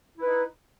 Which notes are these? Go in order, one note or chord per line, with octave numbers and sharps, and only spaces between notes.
D#4 E4 B4